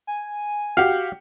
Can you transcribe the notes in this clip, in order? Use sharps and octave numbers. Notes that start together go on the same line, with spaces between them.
G#5
F#4 G4 F5